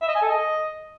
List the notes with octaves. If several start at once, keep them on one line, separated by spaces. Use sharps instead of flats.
E5
D#5
G#5
A4
D#5